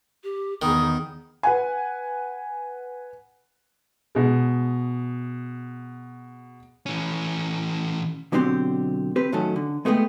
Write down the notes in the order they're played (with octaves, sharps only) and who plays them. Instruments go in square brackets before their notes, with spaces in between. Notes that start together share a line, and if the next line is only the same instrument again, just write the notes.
[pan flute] G4
[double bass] E2 B3 [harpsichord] D#3 [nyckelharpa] D#4 G#4 [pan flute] D#6
[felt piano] B4 F#5 G#5
B2 G#3
[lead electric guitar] E3 C#4
[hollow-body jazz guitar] B2 D3 F#3 C4 G4 C5
C4 G4 B4 C5
A2 D#3 F#3 A3 C#4 A4
D3
G#3 A3 B3 E4 G#4 G5